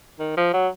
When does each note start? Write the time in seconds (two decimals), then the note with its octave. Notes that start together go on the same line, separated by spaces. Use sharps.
0.19 D#3
0.37 F3
0.53 F#3